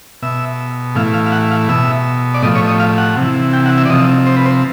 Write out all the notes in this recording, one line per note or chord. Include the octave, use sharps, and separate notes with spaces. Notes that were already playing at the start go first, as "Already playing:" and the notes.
B2 E5
A2 E3 F5
F5
F5
F#5
F5
B2 E5
D5
A2 F3 D#5
C#5
D#5
F5
F#5
C3 E3
G5
F#5
E5
D5
C3 F3 D#5
C5
B4
C5